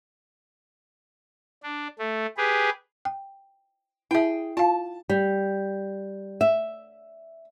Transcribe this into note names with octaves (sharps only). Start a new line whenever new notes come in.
D4
A3
G4 G#4 B4
G5
E4 G#4 E5 G5
F4 F5 A5
G3
E5